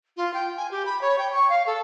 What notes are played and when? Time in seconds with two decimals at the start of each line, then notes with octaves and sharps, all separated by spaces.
0.17 F4
0.34 G5
0.57 G#5
0.71 G4
0.86 B5
1.01 C#5
1.19 G5
1.32 C#6
1.50 F5
1.66 A4